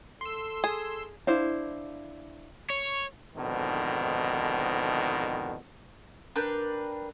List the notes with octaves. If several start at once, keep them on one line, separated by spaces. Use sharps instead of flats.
A4 C6 E6
G#4
D4 E4 C5 F5
C#5
F2 G#2 B2 D3 D#3
D4 A#4 B4 G5